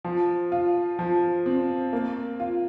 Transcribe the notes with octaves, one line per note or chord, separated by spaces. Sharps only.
F3
F4
F3
C4
A#3
F4